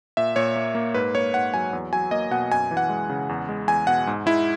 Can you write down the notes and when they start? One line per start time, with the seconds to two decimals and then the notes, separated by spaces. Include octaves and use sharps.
0.17 A#2 E5
0.36 A#2 C#5
0.56 A#3
0.75 A#3
0.94 G#2 B4
1.15 A#3 C#5
1.34 G#2 F#5
1.54 F#3 G#5
1.73 E2
1.93 F#3 G#5
2.11 A#3 D#5
2.31 B2 F#5
2.52 F#2 G#5
2.71 E3
2.77 F#5
2.89 G#3
3.10 C#3
3.29 E2
3.49 G#3
3.68 E2 G#5
3.87 B2 F#5
4.07 G#2
4.26 G#3 E4